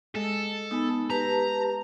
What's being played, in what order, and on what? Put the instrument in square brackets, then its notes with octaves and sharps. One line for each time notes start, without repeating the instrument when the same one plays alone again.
[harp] G#3 G#4 D#5 [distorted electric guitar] A4
[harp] B3 G#5 B5 [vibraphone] D#4
[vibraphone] G4 B4 A5 [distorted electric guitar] A#5